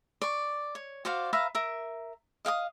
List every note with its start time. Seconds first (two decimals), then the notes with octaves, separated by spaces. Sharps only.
0.22 D5 C#6
0.75 C#5
1.05 F#4 C5 D5 F5
1.33 B4 E5 F5 A#5
1.55 A#4 E5
2.45 D#5 F5 G5 D#6